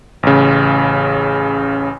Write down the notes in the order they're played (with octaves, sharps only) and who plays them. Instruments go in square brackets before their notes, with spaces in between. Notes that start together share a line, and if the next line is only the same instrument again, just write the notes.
[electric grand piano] A1 C#3